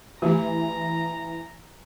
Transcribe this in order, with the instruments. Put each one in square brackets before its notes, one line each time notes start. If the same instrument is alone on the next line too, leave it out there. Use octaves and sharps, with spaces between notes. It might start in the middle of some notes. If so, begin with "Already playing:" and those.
[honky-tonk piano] E3 [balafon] A3 G4 [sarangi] A#5